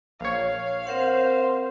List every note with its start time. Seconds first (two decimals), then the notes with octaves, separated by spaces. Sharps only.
0.21 A#1 C#5 F5
0.87 C4 A#4 C5 F#5